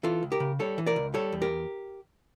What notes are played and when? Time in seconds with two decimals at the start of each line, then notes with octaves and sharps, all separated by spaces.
0.03 E3 F4 A4
0.23 C#2
0.32 G4 A#4
0.40 C#3
0.59 G3 A4 C#5
0.78 E3
0.86 A#4 D5
0.96 C#2
1.14 G3 A4 C#5
1.32 E2
1.42 G4 A#4